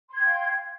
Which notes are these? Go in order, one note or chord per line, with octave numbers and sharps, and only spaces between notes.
F5 G5 C6 G#6